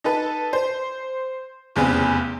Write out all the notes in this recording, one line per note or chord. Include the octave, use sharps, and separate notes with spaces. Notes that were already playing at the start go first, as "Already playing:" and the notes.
D#4 A4 B4
C5
F1 E2 C#3 B3 C4